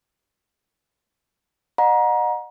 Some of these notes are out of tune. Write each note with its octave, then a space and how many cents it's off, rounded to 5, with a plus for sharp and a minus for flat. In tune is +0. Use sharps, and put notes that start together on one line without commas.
D#5 -40 F#5 -30 A#5 +25